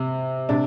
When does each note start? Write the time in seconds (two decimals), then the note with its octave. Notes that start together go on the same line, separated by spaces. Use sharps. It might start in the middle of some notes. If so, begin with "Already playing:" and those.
Already playing: C3
0.49 C3 D4